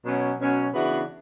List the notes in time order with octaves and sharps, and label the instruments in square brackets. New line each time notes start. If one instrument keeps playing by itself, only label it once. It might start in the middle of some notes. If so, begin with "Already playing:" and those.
[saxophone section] B2 F#3 C#4
B2 F#3 C#4
C#3 E3 B3 D4 F#4